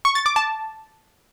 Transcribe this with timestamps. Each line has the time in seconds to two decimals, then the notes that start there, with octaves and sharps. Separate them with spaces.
0.05 C#6
0.15 A6
0.26 D6
0.36 A5